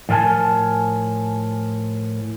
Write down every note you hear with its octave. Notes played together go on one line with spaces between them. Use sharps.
A2 F3 A#4 G#5 A5